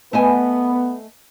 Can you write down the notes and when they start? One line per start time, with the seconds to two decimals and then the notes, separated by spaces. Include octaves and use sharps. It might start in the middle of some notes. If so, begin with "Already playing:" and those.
0.13 A3 B3 D#5 G#5